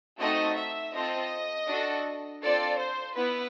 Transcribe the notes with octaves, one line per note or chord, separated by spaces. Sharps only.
A3 C4 D#4 F#4 A4 D#5
E5
C4 F4 A4 D#5
D4 F#4 A4
C4 F4 A4 D5
C5
B3 E4 B4